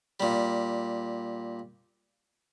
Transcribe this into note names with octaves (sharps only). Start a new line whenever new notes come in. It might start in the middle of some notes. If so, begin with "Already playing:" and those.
A#2 G3